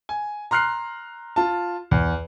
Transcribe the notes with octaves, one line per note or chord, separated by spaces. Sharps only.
G#5
A#5 C6 F6 F#6 C7
F4 A5
E2